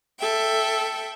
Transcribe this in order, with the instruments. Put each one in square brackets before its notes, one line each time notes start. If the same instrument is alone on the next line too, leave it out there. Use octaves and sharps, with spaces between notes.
[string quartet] A4 E5 G5